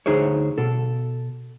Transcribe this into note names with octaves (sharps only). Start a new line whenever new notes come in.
D2 D#4 G#4 C5 C#5
B2 A4